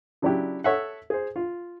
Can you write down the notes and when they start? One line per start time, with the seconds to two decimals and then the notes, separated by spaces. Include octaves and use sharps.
0.22 C#3 F#3 D4 E4 G4
0.64 A4 C#5 E5 F#5
1.10 G#4 C5
1.36 F4